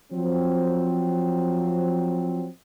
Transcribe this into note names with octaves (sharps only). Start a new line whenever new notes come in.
F3 F#3 C4